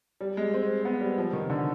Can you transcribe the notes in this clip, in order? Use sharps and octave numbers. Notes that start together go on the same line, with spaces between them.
G3
G#3
C4
B3
G3
F3
D#3
D3